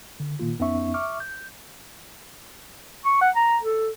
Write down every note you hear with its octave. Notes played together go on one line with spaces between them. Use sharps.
D3
A#2 D#3 A#3 F4
F2 B3 C#4 D#4 E5 C#6
E5 C#6 D6 F6
G6
C#6
F#5
A#5
A4